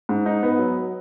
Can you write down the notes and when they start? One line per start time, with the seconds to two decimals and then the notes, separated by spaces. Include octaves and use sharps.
0.09 G#2
0.26 D#4
0.43 B3
0.59 F#3